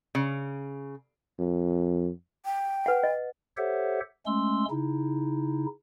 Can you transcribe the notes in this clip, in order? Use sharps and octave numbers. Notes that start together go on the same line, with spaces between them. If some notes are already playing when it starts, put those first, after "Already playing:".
C#3
F2
G5
B4 F#5
D#5
G4 A4 C5 C#5 E5 F#5
G#3 A3 C#4 C6 E6
C#3 D#4 E4